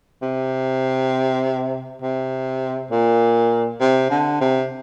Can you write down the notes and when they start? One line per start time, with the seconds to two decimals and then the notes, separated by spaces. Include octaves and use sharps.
0.22 C3
2.02 C3
2.91 A#2
3.81 C3
4.10 D3
4.41 C3